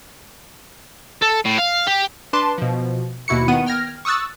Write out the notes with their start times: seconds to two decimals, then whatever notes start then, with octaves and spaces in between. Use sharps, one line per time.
1.22 A4
1.45 A2
1.58 F5
1.87 G4
2.33 D4 B4 A5 C6 D6
2.58 B2 F3
3.28 D#2 B2 E4 F#4 C#7
3.48 D#3 B3 F#5 D#7
3.66 G5 F6 G#6 A#6
4.05 C#6 D#6 E6 F#6 A6